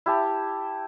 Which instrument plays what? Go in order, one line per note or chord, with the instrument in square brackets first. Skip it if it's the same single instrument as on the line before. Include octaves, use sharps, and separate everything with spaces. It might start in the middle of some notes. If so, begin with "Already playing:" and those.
[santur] E4 G4 A5